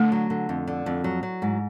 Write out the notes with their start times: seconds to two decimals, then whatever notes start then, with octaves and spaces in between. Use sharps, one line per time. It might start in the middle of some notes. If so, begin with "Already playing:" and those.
Already playing: D3 A3
0.12 F#3
0.30 D3
0.49 F2
0.67 D3
0.86 F2
1.04 F#3
1.23 F#3
1.42 G#2